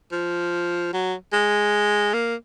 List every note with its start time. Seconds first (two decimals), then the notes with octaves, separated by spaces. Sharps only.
0.12 F3
0.93 F#3
1.33 G#3
2.14 A#3